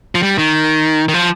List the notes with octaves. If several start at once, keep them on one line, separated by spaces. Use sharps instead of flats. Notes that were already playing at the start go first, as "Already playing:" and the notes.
F3
G3
D#3
D#3
F3